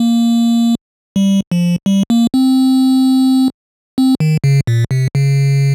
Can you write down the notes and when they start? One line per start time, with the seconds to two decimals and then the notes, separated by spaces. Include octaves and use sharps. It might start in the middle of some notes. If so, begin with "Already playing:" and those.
Already playing: A#3
1.16 G3
1.52 F3
1.86 G3
2.10 A#3
2.34 C4
3.98 C4
4.20 D#3
4.44 C#3
4.67 A#2
4.91 C3
5.15 C#3